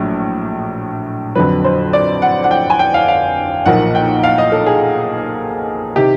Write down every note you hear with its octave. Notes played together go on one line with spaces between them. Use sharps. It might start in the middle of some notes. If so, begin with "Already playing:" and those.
Already playing: A#1 A2 F#3
F2 D3 F#3 B4
C5
D5
F#5
F#5
G5
G#5
G5
F5
F5
B1 A#2 F3 A#3 F#5
G5
F5
D#5
A4
G#4
C3 D#3 G4